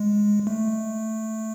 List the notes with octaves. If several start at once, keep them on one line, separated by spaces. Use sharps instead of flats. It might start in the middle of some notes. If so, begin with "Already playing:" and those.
Already playing: G#3
A3